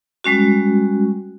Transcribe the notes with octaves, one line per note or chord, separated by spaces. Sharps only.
G3 G#3 C#4 F#4